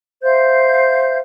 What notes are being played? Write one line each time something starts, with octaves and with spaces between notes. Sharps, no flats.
C5 E5 F5 G6